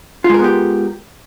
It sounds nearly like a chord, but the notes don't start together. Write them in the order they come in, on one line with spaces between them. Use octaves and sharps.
F4 G#3 A#4 B3 G4